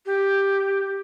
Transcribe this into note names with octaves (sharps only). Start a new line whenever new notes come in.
G4